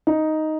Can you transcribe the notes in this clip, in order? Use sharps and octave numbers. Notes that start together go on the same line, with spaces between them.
D#4